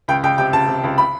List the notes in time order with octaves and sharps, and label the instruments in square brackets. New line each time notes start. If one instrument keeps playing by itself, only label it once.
[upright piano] C#2 G5
C#2 G5
C3 G5
C#2 A5
C3
C#2
B5